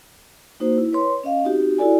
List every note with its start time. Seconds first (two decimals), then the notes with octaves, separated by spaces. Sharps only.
0.60 A#3 D#4 F#4 C5
0.78 E4
0.92 B4 C#5 C6
1.24 C#4 D#5 F5
1.44 C4 D#4 F#4 G4
1.78 E4 F#4 A4 D5 G#5